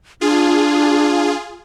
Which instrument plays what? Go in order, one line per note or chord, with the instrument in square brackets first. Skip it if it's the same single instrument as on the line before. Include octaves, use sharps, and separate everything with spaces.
[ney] D4 [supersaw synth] F4 G#4